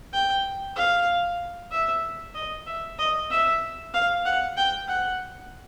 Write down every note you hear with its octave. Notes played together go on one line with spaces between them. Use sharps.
G5
F5
E5
D#5
E5
D#5
E5
F5
F#5
G5
F#5